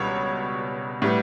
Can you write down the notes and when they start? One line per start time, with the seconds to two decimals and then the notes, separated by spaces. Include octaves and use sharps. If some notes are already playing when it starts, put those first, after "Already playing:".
Already playing: C#2 B2 G3 C#5
1.02 A2 G3 B3